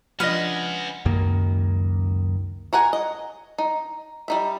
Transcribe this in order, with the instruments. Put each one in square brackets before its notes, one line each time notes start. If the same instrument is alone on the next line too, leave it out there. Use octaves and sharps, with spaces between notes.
[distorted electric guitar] C#3 G#3 [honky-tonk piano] F3 D4 [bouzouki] B4 F#5 [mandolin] D#5 F6
[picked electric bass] C#2 F#2 D#3 A#3
[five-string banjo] F#4 A#4 F#5 G#5
D#5
D#4
G3 D#4 E5